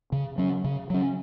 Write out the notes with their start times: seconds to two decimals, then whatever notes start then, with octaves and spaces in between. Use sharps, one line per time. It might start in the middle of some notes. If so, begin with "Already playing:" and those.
0.12 C#3
0.38 F#3 C#4
0.64 C#3
0.90 F#3 C#4